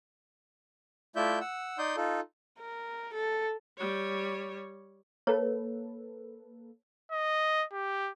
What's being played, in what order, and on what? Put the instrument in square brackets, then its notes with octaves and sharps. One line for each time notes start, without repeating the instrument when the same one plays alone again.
[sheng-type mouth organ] A3 E4 F4 D5 E5 G6
F#5 E6
D#4 D5 C6 D#6 G6
D#4 F4 A4
[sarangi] A#4
A4
[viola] G3 C#5
[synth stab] A#3 A4 B4 [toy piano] C#5
[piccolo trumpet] D#5
G4